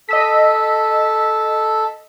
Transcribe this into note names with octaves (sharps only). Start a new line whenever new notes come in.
A4 D#5 E6 B6